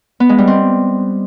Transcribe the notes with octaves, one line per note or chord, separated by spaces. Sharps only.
B3
G#3
G3
C4